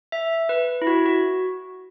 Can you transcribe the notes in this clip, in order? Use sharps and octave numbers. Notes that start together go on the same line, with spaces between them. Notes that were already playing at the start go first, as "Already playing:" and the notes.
E5
B4
E4
F#4
F#4